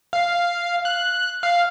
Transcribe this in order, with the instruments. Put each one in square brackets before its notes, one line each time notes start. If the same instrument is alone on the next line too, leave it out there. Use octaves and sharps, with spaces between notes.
[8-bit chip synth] F5
F#6
F5